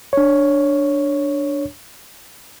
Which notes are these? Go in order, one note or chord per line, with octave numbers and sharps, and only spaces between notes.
D4 C#5